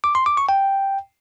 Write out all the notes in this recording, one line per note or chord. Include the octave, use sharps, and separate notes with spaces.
D6
C6
D6
C#6
G5